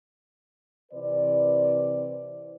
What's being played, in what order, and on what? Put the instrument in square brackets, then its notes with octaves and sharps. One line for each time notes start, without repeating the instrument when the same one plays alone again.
[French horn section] C3 E3 B4 C5 D5